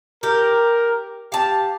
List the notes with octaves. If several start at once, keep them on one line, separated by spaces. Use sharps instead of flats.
G4 A#4
G4 F5 A5